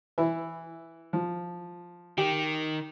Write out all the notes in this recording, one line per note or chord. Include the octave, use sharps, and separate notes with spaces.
E3 E4
F3
D#3 G4